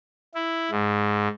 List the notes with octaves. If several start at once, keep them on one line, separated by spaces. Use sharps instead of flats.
E4
G#2